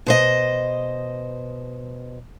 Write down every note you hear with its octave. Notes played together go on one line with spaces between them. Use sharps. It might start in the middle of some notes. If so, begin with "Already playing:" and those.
B2 C5 D#5